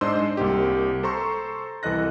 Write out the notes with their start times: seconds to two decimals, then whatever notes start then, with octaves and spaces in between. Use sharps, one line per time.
0.01 G#2 D4 C5 D#5 C6 E6
0.37 C2 A#3 G4
1.03 A4 C5 A#5 C6 C#6
1.83 C2 E3 A4 D#5 F#6 A#6